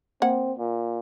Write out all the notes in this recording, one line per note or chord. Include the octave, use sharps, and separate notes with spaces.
A#3 C4 F#5
A#2